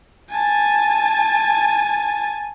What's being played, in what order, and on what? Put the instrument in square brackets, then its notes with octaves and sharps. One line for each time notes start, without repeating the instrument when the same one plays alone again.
[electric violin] G#5 A5